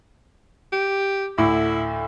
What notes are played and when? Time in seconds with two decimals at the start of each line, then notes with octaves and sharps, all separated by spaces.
0.73 G4
1.38 D2 A2 E4 D6